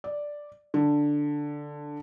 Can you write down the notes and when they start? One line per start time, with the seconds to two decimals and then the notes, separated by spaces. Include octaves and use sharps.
0.04 D5
0.74 D3